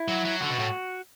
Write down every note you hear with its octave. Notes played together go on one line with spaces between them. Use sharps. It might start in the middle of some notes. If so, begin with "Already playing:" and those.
Already playing: E4
F#3
F#3
D3 F#4
B2
A2